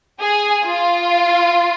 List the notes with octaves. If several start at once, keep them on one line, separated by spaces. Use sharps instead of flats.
G#4
F4